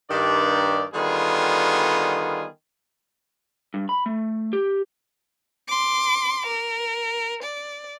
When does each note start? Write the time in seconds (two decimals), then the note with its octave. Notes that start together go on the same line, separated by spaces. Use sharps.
0.10 G2 D#3 D5
0.94 D3 D#3 G3 B3 F4 G#4
3.74 G2
3.89 B5
4.06 A3
4.53 G4
5.68 C6 D6
6.46 A#4
7.43 D5